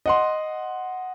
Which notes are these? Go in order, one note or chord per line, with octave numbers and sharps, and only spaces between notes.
D#5 F#5 C6